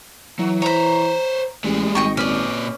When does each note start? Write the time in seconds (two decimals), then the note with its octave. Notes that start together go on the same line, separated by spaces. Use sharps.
0.39 E3 F#3
0.62 C5 C#5 A#5 B5
1.64 A1 G3 G#3
1.95 G#1 D#5 G5 C#6
2.17 A#2 C#4 B4 D5